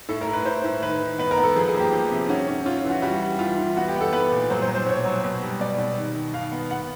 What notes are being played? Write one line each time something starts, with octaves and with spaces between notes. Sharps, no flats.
A2 A4
A#4
A2
B4
A2 C5
A2
D#3 B4
D#3
B3 B4
A#4
B3
A4
F3 G#4
G#4
A#3
G4
F3
C3
C#4 F#4
C#4
C#4 F4
F4
E3
F#4
G3 F#4
G3
E3 F4
E3
B3 F#4
G4
B3
A4
B3 B4
A#2
F#3 C5
C5
F#3
C5
B2 C#5
F#3
B2
G3
B2 D5
B2
D#3
D#3
D#3 F5
B3
B3 F#5